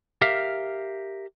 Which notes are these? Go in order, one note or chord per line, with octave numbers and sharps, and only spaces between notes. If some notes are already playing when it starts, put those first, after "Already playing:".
G4 A#4 E5 F5